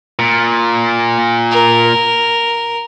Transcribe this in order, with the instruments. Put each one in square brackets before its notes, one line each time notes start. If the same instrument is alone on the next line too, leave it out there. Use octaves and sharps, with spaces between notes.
[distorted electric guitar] A#2
[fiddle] A#4